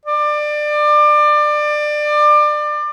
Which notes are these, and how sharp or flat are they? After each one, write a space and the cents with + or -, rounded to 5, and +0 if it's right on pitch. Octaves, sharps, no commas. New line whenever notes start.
D5 +25